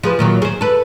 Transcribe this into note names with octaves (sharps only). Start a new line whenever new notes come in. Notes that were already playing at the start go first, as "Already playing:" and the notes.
F3 G#4 B4
A#2 D#3 F#3
G#4 C5
A4 B4